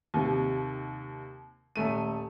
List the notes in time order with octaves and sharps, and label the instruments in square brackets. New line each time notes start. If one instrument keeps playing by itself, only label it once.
[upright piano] D#2 C3
D#1 A3 D#7